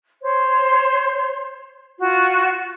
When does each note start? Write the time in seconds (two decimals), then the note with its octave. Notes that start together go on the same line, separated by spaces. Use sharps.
0.22 C5 C#5
2.01 F4 F#4